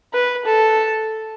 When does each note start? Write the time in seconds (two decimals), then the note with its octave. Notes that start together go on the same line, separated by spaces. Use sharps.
0.13 B4
0.45 A4